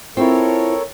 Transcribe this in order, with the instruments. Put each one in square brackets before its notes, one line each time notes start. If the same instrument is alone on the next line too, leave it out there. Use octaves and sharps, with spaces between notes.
[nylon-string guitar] C4 [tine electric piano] E4 F4 [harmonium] A4 A#4 C#5